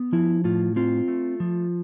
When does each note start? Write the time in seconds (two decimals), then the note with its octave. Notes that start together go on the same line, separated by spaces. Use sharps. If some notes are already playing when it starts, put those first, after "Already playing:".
Already playing: B3
0.12 F3 E4
0.44 A2 F4
0.76 C4 F4
1.08 A3
1.40 F3